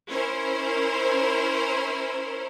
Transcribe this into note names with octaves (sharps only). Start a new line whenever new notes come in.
C#4 E4 A#4 C5